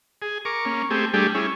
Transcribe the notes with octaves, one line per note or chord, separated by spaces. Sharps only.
G#4
A#4 C#6 D6
A#3 C#4
A3 C4 G4 G#4
G3 A3 D4 G4 G#4
C#4 E4 G#4